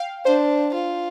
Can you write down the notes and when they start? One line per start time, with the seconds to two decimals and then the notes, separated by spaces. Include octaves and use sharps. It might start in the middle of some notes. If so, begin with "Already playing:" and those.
Already playing: F5 G5
0.25 D4 C5
0.74 F4